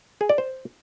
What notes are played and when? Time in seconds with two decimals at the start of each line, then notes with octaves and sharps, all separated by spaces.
0.21 G#4
0.29 D5
0.38 C5